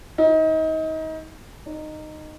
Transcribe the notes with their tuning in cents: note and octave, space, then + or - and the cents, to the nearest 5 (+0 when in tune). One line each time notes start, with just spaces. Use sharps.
D#4 +30
D#4 -15